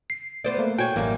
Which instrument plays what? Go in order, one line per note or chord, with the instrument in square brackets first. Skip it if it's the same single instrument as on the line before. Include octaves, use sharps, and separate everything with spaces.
[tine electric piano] C7
[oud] B3 C5 D5
[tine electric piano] A3 A#3
[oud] F#4 C#5 [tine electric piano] G5 G#5
[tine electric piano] A1 A#3 [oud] F#2 G3